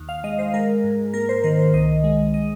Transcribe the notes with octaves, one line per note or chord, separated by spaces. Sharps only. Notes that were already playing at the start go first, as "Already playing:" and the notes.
Already playing: D#2
F5
G#3 D#5
C5
G#3 A#4
G#2
A#3 A#4
C5
D#3 A#4
C5
C2 D#5
G#3
D#5